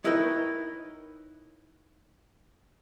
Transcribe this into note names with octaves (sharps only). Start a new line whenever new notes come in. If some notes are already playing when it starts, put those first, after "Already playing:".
D#4 E4 A#4 B4 C#5 G5